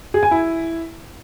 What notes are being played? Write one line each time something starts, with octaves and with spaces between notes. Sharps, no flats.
G#4
G#5
E4